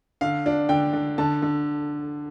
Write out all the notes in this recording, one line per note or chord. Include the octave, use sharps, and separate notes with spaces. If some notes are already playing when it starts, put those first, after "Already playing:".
D3 F5
D4
D3 G5
D3
D3 A5
D3